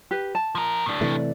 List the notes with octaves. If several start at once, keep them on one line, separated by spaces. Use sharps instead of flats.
G4 B4
A5
F3 A#4
A2 D4
C3 E3 A3 D5